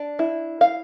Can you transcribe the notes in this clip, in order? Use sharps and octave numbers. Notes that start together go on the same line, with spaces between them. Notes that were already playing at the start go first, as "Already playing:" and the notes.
Already playing: D4
E4
F5